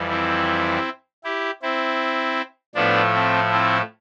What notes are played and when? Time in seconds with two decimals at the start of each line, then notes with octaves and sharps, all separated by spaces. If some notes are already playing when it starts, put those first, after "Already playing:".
Already playing: F2 E3 G3
0.10 C4 E4
1.24 E4 G4
1.62 C4 E4
2.75 A2 F3 A3 B3 D4
3.13 C4
3.51 C4 E4